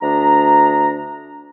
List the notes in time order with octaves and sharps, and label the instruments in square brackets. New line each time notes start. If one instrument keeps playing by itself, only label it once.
[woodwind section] D2 D4 A#5